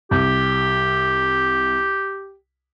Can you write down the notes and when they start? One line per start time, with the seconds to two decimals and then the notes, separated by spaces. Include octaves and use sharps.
0.11 C2 G4